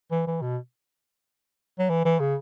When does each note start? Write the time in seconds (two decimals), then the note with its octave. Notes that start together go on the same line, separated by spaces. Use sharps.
0.11 E3
0.27 E3
0.41 B2
1.79 F#3
1.90 E3
2.05 E3
2.20 C#3